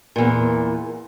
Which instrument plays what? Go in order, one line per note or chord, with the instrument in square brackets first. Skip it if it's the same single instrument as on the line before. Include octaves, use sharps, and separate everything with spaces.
[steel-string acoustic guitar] E2 A#2